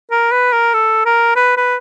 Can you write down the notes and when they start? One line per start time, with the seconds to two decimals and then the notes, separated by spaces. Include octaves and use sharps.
0.11 A#4
0.32 B4
0.52 A#4
0.74 A4
1.06 A#4
1.36 B4
1.57 B4